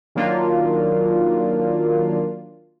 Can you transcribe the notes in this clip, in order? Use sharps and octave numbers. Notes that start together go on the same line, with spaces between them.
D#3 F#3 A#3 D4 F4